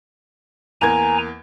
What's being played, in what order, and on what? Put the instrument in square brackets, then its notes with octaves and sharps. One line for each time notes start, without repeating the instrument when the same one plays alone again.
[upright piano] E2 A#3 G#6 [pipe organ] G#5 A#5